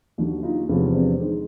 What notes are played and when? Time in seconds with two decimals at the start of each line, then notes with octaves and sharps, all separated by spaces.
0.18 D#2 D3 F#3
0.43 D#4 F4
0.68 E2 C3 F3 G#3 B3 C#4
0.94 C4 D4
1.20 D#3 G#3